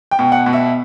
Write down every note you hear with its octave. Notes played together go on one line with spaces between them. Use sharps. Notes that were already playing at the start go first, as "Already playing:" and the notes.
G5
B2
F#5
B2
E5